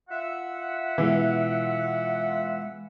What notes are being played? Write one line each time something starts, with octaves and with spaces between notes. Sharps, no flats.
F4 E5 F#5
B2 E3 G#3